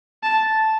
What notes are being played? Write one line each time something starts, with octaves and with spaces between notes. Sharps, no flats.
A5